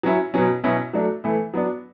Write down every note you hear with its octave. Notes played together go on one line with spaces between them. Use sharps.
F#3 C#4 E4
B2 F#3 C#4
B2 F#3 C#4 E4
F#3 A3 D4
E3 A3 E4
F#3 B3 D4